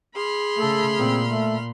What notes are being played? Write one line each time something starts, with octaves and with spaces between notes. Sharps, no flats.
G#4 B5 C6 F6
C#3 A3 A4
A#2 C4
A3